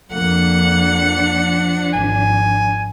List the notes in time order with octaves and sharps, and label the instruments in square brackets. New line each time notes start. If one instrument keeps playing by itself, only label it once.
[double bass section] F2 A#3 [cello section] F3 D4 [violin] F#5 C#7
[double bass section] G#1 [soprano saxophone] G#5